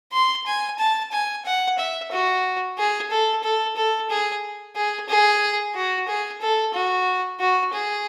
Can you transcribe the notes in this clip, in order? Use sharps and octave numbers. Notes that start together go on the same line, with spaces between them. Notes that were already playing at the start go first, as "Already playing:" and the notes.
C6
G#5
A5
G#5
F#5
E5
F#4
G#4
A4
A4
A4
G#4
G#4
G#4
F#4
G#4
A4
F#4
F#4
G#4